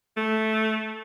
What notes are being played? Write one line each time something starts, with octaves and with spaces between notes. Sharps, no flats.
A3